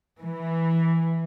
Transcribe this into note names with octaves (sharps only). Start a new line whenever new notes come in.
E3